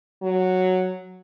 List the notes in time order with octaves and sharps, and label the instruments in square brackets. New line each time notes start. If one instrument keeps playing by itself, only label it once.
[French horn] F#3